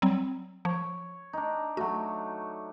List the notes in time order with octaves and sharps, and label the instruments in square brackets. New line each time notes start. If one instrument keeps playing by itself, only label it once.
[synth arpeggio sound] F#3 G3 C4
[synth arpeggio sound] F3 [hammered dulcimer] C#5
[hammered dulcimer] D4 D#4
[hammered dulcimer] F#3 A3 [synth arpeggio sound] F#4